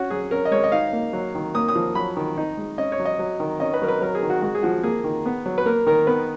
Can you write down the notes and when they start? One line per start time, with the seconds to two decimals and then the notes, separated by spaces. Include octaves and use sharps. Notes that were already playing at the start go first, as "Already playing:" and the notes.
Already playing: C#4 F#4
0.10 F#3 G#4
0.31 C#4 A#4
0.45 D#5
0.51 G#3 C#5
0.64 D#5
0.72 D#4 F5
0.93 A#3
1.13 F#3
1.35 D#3
1.54 A#3 D#6
1.68 D#6
1.76 F3
1.95 F#3 B5
2.17 D#3
2.38 D#4
2.57 G#3
2.78 C#4 D#5
2.92 C#5
2.99 F#3
3.05 D#5
3.19 F#3
3.40 D#3
3.60 C#4 D#5
3.74 B4
3.82 F#3 A#4
3.88 B4
4.01 F#3 A#4
4.15 G#4
4.23 D#3
4.30 F#4
4.42 G#3 F#4
4.55 G#4
4.63 F3 F#4
4.83 A#3 G#4
5.04 D#3
5.26 B3
5.46 F#3
5.58 B4
5.66 A#3 A#4
5.86 D#3 A#4
6.07 B3 B4